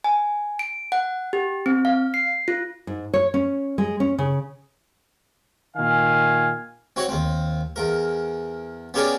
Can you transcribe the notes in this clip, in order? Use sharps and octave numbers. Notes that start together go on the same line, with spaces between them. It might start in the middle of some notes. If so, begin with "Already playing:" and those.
G#5
D7
F#5
G4
C4
F5
C7
F4
G#2
C#5
C#4
G#3
C#4
C#3
A#2 D#3 F5 G#5
C4 F#4 C#5 F#5
D#2 C4
E2 A#4
B3 C#4 G4 G#4 A#4 D5